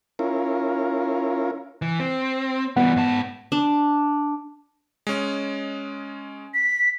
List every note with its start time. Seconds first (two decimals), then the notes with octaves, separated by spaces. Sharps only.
0.19 C#4 E4 F4 A#4
1.82 E3
2.00 C4
2.77 E3 G3 B3 F#5
2.96 G#2 A5
3.52 D4
5.07 G#3 C#4
6.54 B6